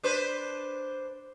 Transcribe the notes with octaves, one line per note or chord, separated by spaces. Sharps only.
D4 B4 C5